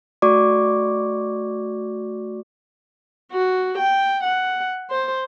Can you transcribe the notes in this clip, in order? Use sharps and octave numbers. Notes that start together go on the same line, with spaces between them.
A3 F#4 D5 C#6 D6
F#4
G5
F#5
C5